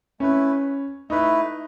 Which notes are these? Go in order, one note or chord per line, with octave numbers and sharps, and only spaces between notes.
A3 C#4 E4 B4
A3 D#4 E4 B4